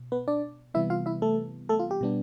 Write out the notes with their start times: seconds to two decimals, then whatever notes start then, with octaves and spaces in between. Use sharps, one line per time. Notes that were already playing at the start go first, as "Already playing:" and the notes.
Already playing: B2
0.12 B3 B4
0.28 D4 D5
0.74 C3 E3 G3 B3 E4 E5
0.90 F4 F5
1.06 E4 E5
1.22 A3 A4
1.69 A3 A4
1.79 F4
1.91 G4
2.01 B2 G3 B3 D4